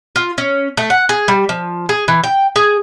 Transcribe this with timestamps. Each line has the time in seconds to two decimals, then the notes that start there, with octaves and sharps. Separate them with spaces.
0.16 F4
0.38 C#4
0.77 A3
0.90 F#5
1.09 G#4
1.28 G3
1.49 F3
1.89 G#4
2.08 E3
2.24 G5
2.56 G#4